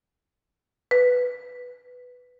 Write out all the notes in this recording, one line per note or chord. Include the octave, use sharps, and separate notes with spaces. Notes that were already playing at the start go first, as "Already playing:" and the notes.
B4